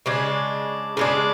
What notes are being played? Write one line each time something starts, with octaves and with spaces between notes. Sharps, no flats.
C#3 G#3 D4
C#3 G#3 D4